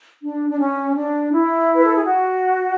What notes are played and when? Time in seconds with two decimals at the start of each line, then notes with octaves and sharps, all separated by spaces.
0.22 D4
0.49 D4
0.59 C#4
0.95 D4
1.32 E4
1.76 B4
1.85 A4
1.95 G#4
2.06 F#4